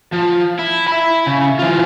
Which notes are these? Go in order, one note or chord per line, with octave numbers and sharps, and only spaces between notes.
F3
E4
E5 B5
C#3
E3 F4